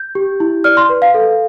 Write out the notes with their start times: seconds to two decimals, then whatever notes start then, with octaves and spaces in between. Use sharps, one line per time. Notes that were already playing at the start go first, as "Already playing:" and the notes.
Already playing: G6
0.15 G4
0.40 E4
0.64 D5 F6
0.77 C6
0.89 B4
1.02 F5
1.14 A4